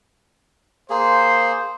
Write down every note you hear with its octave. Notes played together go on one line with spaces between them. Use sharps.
A#3 G#4 C5